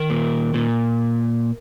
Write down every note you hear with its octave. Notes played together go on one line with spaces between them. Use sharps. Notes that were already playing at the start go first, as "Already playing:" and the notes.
Already playing: D#3 A#4
A#2
A#2